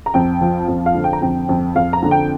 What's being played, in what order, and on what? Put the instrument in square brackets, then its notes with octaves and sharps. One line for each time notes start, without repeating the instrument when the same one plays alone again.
[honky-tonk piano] A#5
F2 G5
F3
F2
F5
D3
G5
A#5
F2 G5
F2
F2 F5
A#5
D3
G5